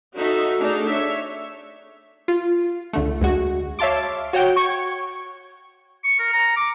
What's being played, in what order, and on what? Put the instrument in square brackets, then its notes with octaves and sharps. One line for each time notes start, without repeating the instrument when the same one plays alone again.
[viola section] D#4 F#4 A4 E5
A3 D4 D#4 G#4
C#5 E5
[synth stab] F4
C#2 D3 A3
D2 G#3 F#4
C#5 E5 F5 A5 C6 D6
F#4 C#5 F#5 G5 G6
C#6 G#6
[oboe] C#6
A#4
A#5
D6